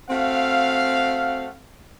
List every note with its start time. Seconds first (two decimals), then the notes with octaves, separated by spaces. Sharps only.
0.10 A3 C4 F#4 F5